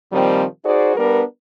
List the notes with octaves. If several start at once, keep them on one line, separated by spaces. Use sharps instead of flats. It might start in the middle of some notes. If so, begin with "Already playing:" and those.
A#2 D#3 F3 G3 C4
D#4 F#4 G#4 C5 D5
G3 B3 D4 A#4 B4